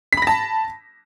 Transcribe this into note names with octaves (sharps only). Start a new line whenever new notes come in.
A5 B5 A#6 B6